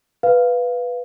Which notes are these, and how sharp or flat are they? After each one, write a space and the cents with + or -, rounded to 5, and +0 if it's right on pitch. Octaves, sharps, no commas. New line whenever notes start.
B4 +0 F5 +0